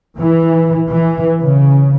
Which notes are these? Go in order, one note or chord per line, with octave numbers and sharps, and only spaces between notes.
E3
E3
C#3